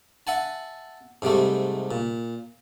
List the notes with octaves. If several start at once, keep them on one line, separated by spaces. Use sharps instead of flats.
E5 F#5 G#5 A5
G#2 C3 G3 A3
A#2